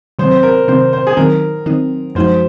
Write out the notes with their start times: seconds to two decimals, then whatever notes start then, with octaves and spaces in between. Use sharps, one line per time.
0.19 C3 D#3 F#3 C4 C5
0.31 C5
0.43 A#4
0.68 C3 D#3 F#3 C4 C5
0.93 C5
1.07 G#4
1.17 D#3 F#3 C4 D#4 A#4
1.66 D#3 F#3 C4 D#4
2.15 F#2 F3 G#3 D#4 F#4 C5